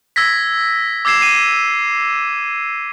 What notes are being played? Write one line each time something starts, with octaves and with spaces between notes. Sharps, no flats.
E6 G#6 A#6 B6
D6 E6 G#6 C7 E7
C7 D#7